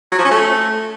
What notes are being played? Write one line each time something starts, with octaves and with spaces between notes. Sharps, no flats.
F#3
F3
C#4
A3